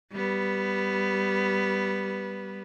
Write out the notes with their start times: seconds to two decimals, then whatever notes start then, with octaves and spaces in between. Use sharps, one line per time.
0.13 G3 B3